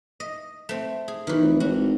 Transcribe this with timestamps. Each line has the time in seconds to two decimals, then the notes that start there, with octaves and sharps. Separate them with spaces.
0.20 D#5
0.69 A3 C4
1.08 G#4
1.27 B1 D#3 E3
1.41 F1
1.60 G#1 F#4